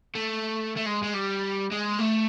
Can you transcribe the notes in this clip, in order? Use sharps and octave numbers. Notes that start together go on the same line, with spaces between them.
A3
A3
G#3
G#3
G3
G#3
A3